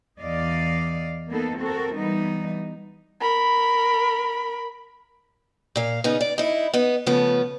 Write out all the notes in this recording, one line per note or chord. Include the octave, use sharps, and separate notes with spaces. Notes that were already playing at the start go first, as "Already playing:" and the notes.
E2 D5 D#5 F5
A#3 B3 D#4 A4
C4 F#4 A4 A#4
E3 G3 B3 D#4
A#4 B5
A#2 F5
C#3 B3 D#4
D5
D#4 E4
B3 D#4
C#3 F3 A3 B3